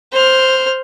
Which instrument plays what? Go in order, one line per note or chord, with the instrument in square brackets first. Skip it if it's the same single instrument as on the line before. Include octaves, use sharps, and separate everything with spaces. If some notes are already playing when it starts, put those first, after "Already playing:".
[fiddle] C5 F6